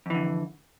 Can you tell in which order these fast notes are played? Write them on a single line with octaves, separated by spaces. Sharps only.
F2 E3 D3